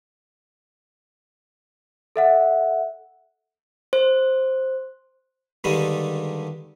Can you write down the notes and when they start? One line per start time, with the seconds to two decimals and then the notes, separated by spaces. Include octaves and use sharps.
2.16 A4 E5 F#5
3.93 C5
5.64 G2 D3 D#3 G3 G#3 D4